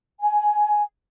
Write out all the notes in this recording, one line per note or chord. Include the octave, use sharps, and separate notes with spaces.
G#5